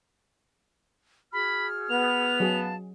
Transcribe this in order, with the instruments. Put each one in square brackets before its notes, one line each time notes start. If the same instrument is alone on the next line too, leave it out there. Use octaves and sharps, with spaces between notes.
[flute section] F#4 G#4 F6 [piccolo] B5
[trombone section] B3 [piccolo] F7
[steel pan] F#3 G#4 [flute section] F5 A5